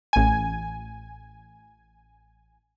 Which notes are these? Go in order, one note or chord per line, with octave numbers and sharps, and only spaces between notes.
A1 G#5